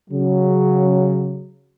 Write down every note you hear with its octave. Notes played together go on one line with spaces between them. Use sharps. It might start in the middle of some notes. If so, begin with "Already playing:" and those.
C#3 F#3